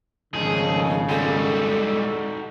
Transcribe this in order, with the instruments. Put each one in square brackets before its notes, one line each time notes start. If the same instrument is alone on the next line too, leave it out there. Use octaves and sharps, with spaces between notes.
[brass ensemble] G#1 A#2 C#3 [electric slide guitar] F3 A3 D#4 [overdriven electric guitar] G#4
[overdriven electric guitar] G3 G#3 [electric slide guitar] D#4 F#4 G4 [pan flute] A4